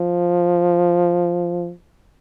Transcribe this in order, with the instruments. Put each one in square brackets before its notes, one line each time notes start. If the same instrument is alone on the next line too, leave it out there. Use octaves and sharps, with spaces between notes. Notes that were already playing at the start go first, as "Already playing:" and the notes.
Already playing: [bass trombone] F3